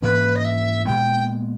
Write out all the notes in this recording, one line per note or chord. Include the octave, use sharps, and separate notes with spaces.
G#2 E3 A#3 C#4 B4
D#5
E5
A#2 G#3 B3 G5